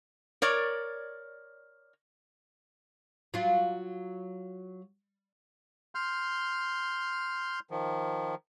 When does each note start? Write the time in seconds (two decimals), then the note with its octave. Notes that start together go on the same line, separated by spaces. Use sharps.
0.42 A#4 C#5 D5
3.34 F#3 F4
5.95 C6 F6 G6
7.71 D#3 F3